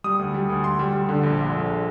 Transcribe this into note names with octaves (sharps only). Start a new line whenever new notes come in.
G3 D#6
D2
G3
D2
D2 C6
G3
G3
D3
A#1
A#1
A#1